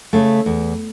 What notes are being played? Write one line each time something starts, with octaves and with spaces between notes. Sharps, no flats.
C#3 A3
E2